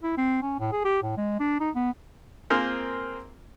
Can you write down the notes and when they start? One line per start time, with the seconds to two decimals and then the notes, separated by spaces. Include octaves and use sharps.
0.03 E4
0.17 C4
0.42 C#4
0.59 A2
0.72 G#4
0.84 G4
1.02 A2
1.17 G#3
1.39 D4
1.60 D#4
1.75 B3
2.50 A#3 C4 F4 G#4 A#4 C5